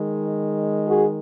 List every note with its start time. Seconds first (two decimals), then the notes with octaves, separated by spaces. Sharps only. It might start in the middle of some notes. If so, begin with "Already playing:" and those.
Already playing: D#3 G#3
0.87 F#4 G#4